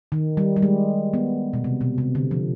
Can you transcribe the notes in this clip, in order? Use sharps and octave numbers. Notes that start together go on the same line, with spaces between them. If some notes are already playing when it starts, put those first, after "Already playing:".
D#3
G3
G3
G#3
B3
B2
C3
B2
C3
D3
F3